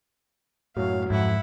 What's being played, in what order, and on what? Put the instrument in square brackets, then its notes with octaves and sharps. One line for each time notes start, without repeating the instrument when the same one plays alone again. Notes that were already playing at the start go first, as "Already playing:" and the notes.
[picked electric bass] F#2 A2 [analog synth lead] F#3 [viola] F5
[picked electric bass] F2 [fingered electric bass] G#2 [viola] E4 F#5